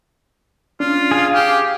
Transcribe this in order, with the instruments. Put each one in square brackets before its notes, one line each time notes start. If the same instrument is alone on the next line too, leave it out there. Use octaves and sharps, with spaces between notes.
[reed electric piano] C#4 D4 [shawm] F4
[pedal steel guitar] G#4 F5
[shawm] G4 [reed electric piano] G#5